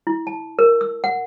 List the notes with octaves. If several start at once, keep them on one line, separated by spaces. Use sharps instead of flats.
E4
A5
A#4
E6
F#5